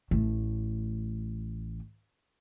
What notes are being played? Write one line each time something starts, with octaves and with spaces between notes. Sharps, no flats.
A1 A3